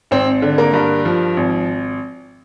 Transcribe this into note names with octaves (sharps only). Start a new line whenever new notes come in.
G#1 C4 C5
D3
A#3 A#4
G2
F3
G#1